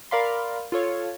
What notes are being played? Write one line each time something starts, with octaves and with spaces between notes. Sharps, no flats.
A#4 D5 F5 B5 C6
F4 A4 C#5